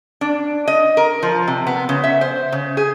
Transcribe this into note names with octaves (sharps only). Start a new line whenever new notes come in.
D4
D#5
A#4
F3
C3
B3
C#3
E5
C5
C#3
G#4